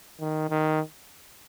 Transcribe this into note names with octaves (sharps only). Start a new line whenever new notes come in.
D#3
D#3